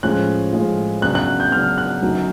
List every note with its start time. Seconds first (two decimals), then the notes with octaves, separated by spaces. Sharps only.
0.03 A2 F3 G#3 C#4 F4 F#6
0.53 A2 F3 G#3 C#4 F4
1.02 F#2 C#3 F#3 B3 D4 F#6
1.15 F#6
1.40 G6
1.52 F#2 C#3 F#3 B3 D4 F6
1.78 F#6
2.02 F#2 D3 F#3 B3 D#4